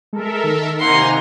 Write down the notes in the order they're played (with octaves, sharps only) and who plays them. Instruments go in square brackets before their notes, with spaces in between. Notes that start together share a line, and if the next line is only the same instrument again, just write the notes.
[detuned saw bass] G#3 [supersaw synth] A4 A#4 E5
[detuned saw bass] D#3
[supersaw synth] C3 G#5 A#5 [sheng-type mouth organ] A#3 F#5 [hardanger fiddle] D#4 C6